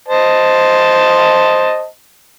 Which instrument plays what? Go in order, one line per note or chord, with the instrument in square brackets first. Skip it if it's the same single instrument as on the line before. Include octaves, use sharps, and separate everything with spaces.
[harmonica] C5 D#5 A5